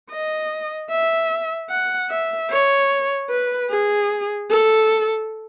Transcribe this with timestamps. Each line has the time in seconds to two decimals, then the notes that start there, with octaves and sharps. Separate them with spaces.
0.10 D#5
0.90 E5
1.70 F#5
2.10 E5
2.50 C#5
3.30 B4
3.70 G#4
4.50 A4